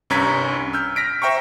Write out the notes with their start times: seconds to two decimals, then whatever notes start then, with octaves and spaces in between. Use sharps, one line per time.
0.10 C2 G2 C#4 A#5 G#6 B6
0.73 E6 F6 G6
0.96 F6 A#6 B6 D7
1.22 C5 E5 G5 A#5 C#6